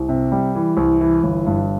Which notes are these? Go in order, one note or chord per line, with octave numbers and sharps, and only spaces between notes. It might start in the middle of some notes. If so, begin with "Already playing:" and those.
Already playing: C2
C3
G3
E3
C2
E3
G1
G2